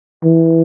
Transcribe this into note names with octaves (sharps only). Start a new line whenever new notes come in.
E3